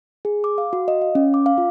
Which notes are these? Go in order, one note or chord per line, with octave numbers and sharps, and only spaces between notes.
G#4
D6
F5
F#4
D#5
F5
C#4
D6
F5
F4